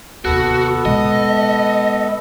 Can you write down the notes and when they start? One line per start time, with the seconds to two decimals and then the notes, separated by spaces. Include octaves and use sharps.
0.25 D#2 C3 B3 F#4 A4
0.85 B2 G#3 D#5